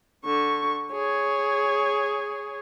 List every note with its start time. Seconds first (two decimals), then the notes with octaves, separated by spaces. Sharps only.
0.25 D3 C#6
0.92 G#4 C#5